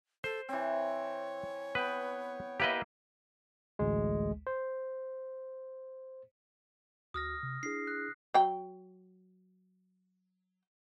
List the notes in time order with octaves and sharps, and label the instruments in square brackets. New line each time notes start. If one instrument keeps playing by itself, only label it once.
[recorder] A4 [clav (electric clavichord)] C5
[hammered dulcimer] E3 C4 [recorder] C#5
[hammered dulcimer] B3 G5 [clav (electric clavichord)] B4
[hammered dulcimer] A#3 E4 [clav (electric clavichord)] G4 B4 D#5
[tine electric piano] A1 D2 G#3
C5
[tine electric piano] D2 F#4 [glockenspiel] D#6 F6 A#6
[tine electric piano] C3
[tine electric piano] D4 E4 G#4 [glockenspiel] C7
[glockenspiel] F#6
[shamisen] F#3 G5